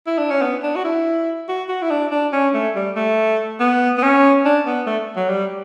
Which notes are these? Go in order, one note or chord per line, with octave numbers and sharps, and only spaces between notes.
E4
D4
C#4
B3
D4
F#4
E4
F#4
F#4
E4
D4
D4
C#4
A3
G3
A3
B3
B3
C#4
D4
B3
A3
F#3
G3